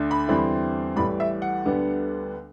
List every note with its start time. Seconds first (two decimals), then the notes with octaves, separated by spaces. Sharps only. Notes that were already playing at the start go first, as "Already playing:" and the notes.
Already playing: D2 A3 D4
0.11 B5
0.28 E2 D3 G3 C4 E4
0.96 A1 A2 E3 G3 B5
1.20 E5
1.42 F#5
1.65 D2 D3 G3 B3